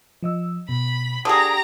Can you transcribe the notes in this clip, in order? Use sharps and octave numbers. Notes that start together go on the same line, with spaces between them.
F3 D#5 E6
B2 B5
D3 G4 G#4 F#5 A#5 D#6